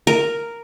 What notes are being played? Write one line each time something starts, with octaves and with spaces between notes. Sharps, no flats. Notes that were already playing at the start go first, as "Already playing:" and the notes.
A#4